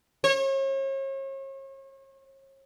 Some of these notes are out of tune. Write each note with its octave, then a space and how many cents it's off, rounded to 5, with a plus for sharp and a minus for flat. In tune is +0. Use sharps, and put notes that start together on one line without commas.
C#5 -40